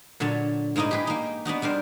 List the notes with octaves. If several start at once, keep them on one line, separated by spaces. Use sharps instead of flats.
A#2 D3 F#3 C#5 A5
G#2 A#3 D#4 E4 D#5
G4 G#4 B4
A#3 D#4
B3 D4 D#4 F#4
G3 D4 A#4 C5